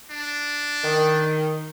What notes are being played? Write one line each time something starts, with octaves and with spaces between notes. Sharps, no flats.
D4
D#3